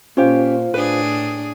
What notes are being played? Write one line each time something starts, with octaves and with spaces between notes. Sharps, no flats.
A#2 C#4 F4 G4 C5 F5
A2 D4 G#4 B4